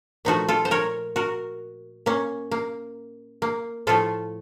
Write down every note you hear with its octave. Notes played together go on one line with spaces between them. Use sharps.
A#2 F3 A3 D#4 F#4
F4 A4
C5
A#4 C#5
F#4 A#4
A#3 C#4
A#3
A#3
A2 F3 A3 F4 A4